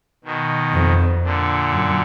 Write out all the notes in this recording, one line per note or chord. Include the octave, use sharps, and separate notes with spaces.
B2 D#3
F2
A#2 D3
F#2